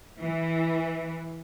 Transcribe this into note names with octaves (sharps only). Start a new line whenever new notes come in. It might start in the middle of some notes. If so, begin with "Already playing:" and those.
E3